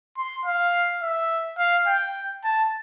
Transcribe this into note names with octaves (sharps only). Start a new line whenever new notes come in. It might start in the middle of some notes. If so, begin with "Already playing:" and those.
C6
F5
E5
F5
G5
A5